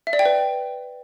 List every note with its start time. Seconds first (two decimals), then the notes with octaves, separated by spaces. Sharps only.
0.07 E5
0.13 D5
0.19 G5
0.25 B4